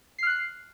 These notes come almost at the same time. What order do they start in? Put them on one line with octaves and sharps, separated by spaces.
C7 F6 F#6